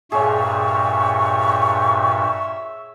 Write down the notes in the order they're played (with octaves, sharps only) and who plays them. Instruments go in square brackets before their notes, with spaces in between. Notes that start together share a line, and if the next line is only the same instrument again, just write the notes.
[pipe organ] G2 A#2 [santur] G#4 C#5 [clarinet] E5 [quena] C#6